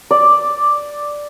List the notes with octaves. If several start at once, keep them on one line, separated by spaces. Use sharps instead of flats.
D5